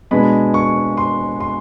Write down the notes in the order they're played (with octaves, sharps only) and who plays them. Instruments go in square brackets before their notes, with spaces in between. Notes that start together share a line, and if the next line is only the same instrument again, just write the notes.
[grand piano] B2 G#3 B3 D4 B5
C#6
C6
C6